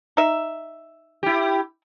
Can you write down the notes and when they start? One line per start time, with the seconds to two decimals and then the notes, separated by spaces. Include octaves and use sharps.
0.17 D#4 E5
1.23 E4 G4